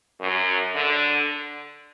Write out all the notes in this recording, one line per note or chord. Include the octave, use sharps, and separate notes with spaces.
F#2
D3